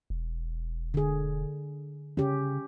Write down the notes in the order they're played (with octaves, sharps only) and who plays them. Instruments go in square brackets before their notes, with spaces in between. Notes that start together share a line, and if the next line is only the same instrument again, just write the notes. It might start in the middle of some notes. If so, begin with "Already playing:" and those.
[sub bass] E1
[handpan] D3 G#4
[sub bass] C#3 [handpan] C#4 G4